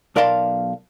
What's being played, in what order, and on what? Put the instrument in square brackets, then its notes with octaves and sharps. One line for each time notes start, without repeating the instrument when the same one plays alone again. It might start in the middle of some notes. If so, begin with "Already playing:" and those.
[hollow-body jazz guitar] B1 A#4 D5 F5 A5 C6